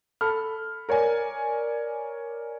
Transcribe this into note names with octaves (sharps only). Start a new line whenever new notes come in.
A4 B5 F6
A#4 C#5 D5 G#5